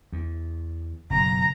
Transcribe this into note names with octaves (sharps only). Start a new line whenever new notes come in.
E2
F#1 B2 A#5